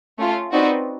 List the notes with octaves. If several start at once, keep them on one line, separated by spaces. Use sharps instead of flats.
A3 C#4 F4
C4 D#4 F#4 B4 D5